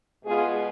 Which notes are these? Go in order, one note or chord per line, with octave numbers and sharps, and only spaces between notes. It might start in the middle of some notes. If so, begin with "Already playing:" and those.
B2 G#3 B3 F4 G#4